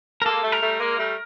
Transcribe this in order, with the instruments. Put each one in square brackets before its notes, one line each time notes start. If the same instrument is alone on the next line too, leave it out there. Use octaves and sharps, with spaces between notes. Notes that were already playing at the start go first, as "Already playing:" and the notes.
[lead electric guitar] A#4
[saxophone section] G#3 A#3 [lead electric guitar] A4
[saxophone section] G3 A3
[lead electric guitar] A#4
[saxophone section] G3 A3
G#3 A#3
G3 A3